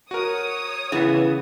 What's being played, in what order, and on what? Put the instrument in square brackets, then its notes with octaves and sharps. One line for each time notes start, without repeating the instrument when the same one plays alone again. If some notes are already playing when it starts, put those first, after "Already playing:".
[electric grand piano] F#4 A#4 [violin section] C#5 D#6
[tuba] C#3 [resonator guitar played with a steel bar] E3 B3